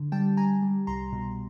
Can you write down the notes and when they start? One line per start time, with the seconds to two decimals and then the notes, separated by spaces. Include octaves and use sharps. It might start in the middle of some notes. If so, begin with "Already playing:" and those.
Already playing: D3
0.12 G3 G5 A5
0.37 G3 G#5 A#5
0.63 G3
0.87 C2 A#5 C6
1.12 B2